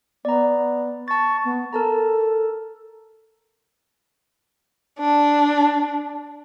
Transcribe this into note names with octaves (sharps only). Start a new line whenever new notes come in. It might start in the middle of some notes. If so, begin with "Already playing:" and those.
B3 D5 A#5
A5 C#6 A6
B3
A4 A#4 A5 A#5
D4